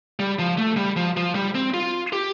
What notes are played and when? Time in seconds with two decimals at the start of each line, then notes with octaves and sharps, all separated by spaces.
0.20 G3
0.39 F3
0.58 A3
0.77 G3
0.96 F3
1.17 F3
1.35 G3
1.55 C4
1.74 F4
2.13 G4